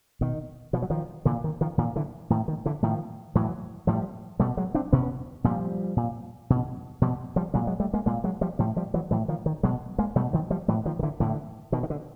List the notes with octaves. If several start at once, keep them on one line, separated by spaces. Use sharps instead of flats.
B2 D#3
B2 F3
F#3
D#3 F3
A#2 D3 E3
D#3
D#3 F3
A#2 D#3 F3
D3 E3
A2 D#3
D#3
D3 E3
A2 D#3 F3
A2 E3 F#3
A2 F3 G3
B2 G3 A3
F#3 G#3
C4 D4
B2 B3 C#4
A#2 F3 G3
A#2
B2
B2 F3 G3
F3 G3
A#2 F#3 G#3
F#3 G#3
G3 A3
G#3 A#3
A#2 G#3 A#3
F#3 G#3
F3 G3
A2 F3 G3
F3 G3
E3 F#3
A2 E3 F#3
D#3 F3
D#3
B2 F#3 G#3
G#3 A#3
B2 G3 A3
D#3 F3
F3 G3
A2 E3 F#3
D#3 F3
D#3
D3 E3
A2 D3 E3
B2 D#3
D#3
D3